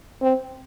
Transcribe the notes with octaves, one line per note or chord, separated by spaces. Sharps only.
C4